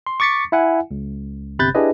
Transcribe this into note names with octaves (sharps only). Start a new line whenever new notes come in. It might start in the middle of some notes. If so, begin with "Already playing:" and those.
C6
C#6 D6 A6 B6 C#7
E4 E5 F#5 G#5
C#2
G1 C3 B5 F#6 G6 A6
D4 E4 G4 G#4 B4 D#5